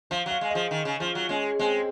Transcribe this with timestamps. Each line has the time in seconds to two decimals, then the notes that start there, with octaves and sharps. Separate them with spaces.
0.11 F3 F5
0.26 F#3 F5
0.41 G#3
0.51 F3 D#5
0.71 D#3
0.85 C#3
1.00 F3 F4
1.15 F#3
1.29 G#3 C#4
1.59 G#3 C4